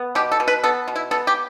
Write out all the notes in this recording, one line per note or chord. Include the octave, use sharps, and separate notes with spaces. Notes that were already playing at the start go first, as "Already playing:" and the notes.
Already playing: B3
B2 G4
A4
B2
B4
B3 A4
B2
E4
B3 A4
G4